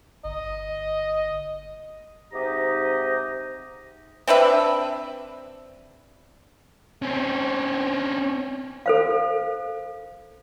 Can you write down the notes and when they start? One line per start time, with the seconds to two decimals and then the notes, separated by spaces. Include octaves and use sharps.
0.24 G1 D#5
2.33 G#2 C3 D#4 G4 A#5 D#6
4.27 C4 D4 B4 E5
7.02 C4 C#4
8.86 A4 C5 F5